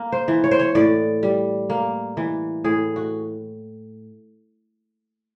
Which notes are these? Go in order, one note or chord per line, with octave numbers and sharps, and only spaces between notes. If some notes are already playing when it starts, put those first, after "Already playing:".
Already playing: A#3
C5
E3
C#5
C5
C#5
A2 D5
G3
A#3
E3
A2 G#4
F#4